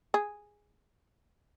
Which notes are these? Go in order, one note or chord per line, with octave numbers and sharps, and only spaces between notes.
G#4